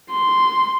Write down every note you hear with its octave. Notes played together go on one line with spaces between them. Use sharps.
C6